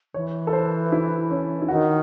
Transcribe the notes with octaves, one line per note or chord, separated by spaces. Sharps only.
E3 C#5
A4
C5
E4
C#4
E4
D#3 F#4